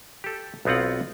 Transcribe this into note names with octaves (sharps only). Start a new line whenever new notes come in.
G4 A4
B1 B3 C4 F4 F#5